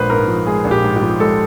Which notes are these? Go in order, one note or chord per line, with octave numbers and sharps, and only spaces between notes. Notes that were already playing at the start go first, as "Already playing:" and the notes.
Already playing: A#1 G#3 B4 C5
G#2 A#4
F3
G#3 G#4
A#1
G4
G#2
G4
F3
G#3 A4